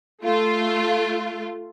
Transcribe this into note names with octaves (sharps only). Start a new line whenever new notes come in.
A3 F4